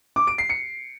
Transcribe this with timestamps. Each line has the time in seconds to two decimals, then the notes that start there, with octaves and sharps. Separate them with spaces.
0.16 D6
0.27 D7
0.38 C7
0.50 C#7